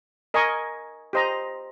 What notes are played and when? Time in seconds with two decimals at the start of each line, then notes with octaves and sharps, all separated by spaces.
0.34 A#4 D#5 G#5 C#6
1.13 G4 C5 D#5 A#5